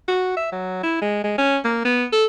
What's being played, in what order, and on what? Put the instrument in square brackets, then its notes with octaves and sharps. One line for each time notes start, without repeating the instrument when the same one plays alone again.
[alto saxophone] F#4
E5
F#3
E4
G#3
G#3
C#4
A#3
B3
A4